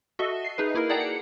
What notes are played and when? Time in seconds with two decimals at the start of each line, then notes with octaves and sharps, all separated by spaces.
0.19 F#4 A4 D#5 E5
0.44 C7
0.58 D#4 G#4 B4
0.75 A#3 E4 G#4 A#4
0.89 G#4 D5 F#5 G5 A5 A#5
1.01 C#7